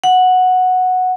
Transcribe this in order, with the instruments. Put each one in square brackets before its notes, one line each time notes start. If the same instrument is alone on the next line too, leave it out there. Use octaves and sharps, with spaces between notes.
[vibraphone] F#5